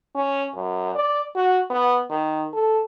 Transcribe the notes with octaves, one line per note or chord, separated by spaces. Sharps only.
C#4
F#2
D5
F#4
B3
D#3
A4